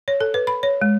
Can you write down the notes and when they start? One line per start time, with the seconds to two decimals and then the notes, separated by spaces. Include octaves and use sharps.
0.08 C#5
0.20 A4
0.34 B4
0.47 B5
0.63 C#5
0.81 G#3